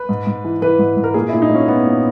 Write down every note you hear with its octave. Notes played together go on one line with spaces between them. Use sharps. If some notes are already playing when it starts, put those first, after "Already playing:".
Already playing: B4
G#2
G#2
E3
E3 B4
G#2
G#2
A#4
A#2 G#4
A#2 E4
D#4
A#2 C#4
A#2 B3
A#2